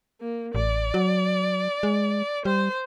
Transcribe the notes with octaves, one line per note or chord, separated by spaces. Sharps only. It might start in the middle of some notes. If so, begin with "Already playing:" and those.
A#3
A1 D5
F#3
G#3
G3 C5